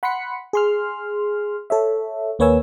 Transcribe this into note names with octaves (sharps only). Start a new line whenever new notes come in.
F#5 B5 C6 F#6 B6 C#7
G#4 C6 F6
A4 C#5 E5
D#2 A#3 B4 C#5 G#5 E6